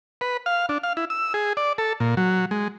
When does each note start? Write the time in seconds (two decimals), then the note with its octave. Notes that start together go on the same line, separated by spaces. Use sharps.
0.21 B4
0.46 F5
0.69 D4
0.83 F5
0.97 E4
1.10 E6
1.34 G#4
1.57 D5
1.78 A4
2.00 A#2
2.17 F#3
2.51 G#3